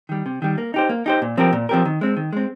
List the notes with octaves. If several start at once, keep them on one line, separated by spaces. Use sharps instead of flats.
D#3 G3
C3
D#3 G3
A#3
D#4 G4 C5
A#3
D#4 G4 C5
A#2
F3 C4 G4 A#4
A#2
F3 C4 G4 A#4
D#3
G#3 C4
D#3
G#3 C4